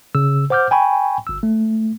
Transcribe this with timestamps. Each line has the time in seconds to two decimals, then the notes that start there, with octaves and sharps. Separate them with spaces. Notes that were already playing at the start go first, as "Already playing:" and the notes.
0.15 C#3 E6
0.50 C5 F#5 D6 F6 G6
0.71 G5 G#5 B5 C#6
1.27 G1 E6
1.43 A3